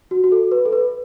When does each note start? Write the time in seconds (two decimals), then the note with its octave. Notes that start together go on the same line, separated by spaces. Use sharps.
0.11 F#4
0.24 F#4
0.32 A4
0.51 B4
0.65 A4
0.72 B4